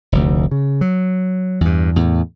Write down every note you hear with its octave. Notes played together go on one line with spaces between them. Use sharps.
F1 D2
C#3
F#3
E2 G2
E2 A2